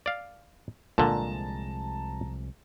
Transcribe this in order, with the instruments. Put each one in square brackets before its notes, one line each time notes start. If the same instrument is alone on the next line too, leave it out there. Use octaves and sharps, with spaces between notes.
[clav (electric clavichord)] D5 F5
[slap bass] C2 F3 G#3 [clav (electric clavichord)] A#2 D3 [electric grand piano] A5 A#5